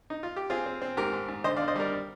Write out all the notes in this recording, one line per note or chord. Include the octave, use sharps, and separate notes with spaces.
D#4
F4
G4
C4 F4 G#4
C4
C4
G#2 G4 A#4
G#2
G#2
D3 C5 D#5
D5 F5
D3
C5 D#5
G3 A#4 D5